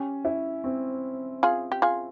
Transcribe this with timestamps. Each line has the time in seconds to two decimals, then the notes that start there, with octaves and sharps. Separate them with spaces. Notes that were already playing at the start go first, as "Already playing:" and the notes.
Already playing: C#4 G4
0.25 E4
0.64 C4
1.43 F4 G#4
1.72 G4
1.82 F4 G#4